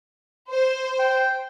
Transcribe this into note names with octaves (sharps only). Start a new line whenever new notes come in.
C5
G5